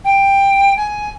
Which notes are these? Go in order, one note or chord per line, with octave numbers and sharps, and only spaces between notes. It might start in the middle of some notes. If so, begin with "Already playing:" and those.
G5
G#5